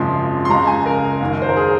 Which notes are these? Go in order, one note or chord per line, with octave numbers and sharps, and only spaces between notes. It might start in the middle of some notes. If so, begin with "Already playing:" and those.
Already playing: G#1 F#2 C#3 F3 G#3 C6
C6
C#2 C#3 G#3 A#5
G#5
A#4
F#1 F#2 D#3
C5
A#4
G#4